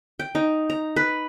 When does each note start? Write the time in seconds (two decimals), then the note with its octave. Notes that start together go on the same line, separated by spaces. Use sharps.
0.19 G5
0.35 D#4
0.70 A#5
0.96 B4